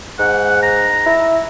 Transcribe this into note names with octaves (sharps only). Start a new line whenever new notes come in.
G#2 F#5
A#5
E4